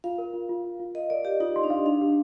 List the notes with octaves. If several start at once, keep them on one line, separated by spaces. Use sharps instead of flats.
F4 F5
A#4
F4
F4
F4
F4
A#4 D#5
A#4 D5
G4 F5
D#4 F4
C6
D4
F5
D4 D#4
G4